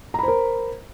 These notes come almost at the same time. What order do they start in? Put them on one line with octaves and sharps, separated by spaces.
A#5 B5 C5 A#4